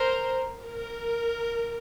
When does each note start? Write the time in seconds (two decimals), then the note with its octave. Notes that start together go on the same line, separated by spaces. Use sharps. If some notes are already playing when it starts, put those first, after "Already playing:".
Already playing: A#4 C5
0.62 A#4